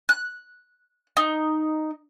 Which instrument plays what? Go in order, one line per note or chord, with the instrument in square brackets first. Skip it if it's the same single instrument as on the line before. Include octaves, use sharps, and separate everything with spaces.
[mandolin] F#6
D#4